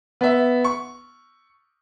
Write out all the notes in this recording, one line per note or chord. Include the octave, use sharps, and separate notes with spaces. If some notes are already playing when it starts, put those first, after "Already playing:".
B3 E5
C#6